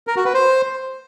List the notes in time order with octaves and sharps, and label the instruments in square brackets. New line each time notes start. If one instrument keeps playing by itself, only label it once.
[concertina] A#4
F#4
B4
C5